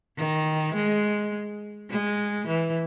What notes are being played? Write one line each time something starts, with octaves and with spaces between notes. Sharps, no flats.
D#3
G#3
G#3
E3